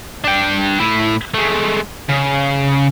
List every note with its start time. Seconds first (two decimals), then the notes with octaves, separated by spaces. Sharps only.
0.24 D4 G5
0.80 A2 E4
1.34 G#3 A3
2.09 C#3